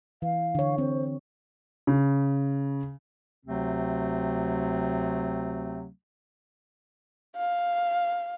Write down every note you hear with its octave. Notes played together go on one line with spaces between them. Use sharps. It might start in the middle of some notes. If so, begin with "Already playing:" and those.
E3 F5
D3 C#5
C4 C5
C#3
D2 C3 F#3 A3 C4
F5